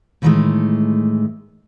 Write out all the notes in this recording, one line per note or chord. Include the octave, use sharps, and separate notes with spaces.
A2 D#3 E3 F#3 G#3 A3